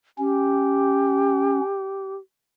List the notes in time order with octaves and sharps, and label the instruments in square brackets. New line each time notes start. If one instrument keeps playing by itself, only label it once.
[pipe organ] C#4 [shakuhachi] G4